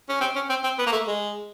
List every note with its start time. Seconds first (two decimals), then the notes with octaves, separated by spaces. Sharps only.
0.09 C#4
0.21 C4
0.35 C#4
0.49 C4
0.64 C4
0.79 B3
0.87 A#3
0.92 A3
1.07 G#3